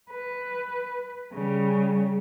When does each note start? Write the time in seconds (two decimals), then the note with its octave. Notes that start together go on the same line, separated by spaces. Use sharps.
0.10 B4
1.33 C#3 G3